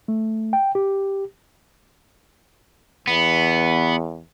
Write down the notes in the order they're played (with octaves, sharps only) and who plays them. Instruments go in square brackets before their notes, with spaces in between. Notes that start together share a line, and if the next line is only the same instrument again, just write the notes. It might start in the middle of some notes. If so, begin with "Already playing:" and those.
[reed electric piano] A3
G5
G4
[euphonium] E2 [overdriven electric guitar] B3